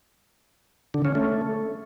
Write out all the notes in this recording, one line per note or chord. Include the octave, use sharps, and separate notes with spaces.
D3
C#4
A3